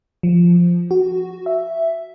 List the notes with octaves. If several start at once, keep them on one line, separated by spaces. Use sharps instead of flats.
F3
F#4
E5